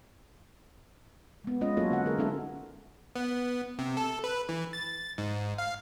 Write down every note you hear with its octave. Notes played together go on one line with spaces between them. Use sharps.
G#3 B3
G#3 C#4 F4 B4 D#5
F#3 A#3 F4 F#4 A4 C#5
D3 F#4 F#5
D3 G#4 A#4
G#3 C#4 D#4 A4 E5
B3
C3
A4
B4
E3
A6
G#2
F5